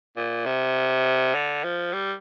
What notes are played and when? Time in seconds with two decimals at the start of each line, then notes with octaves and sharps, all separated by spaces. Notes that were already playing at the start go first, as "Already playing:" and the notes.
0.17 A#2
0.46 C3
1.34 D3
1.64 F3
1.93 G3